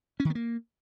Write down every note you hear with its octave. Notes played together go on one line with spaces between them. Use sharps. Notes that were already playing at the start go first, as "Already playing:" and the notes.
C#4
D#3
B3
A#3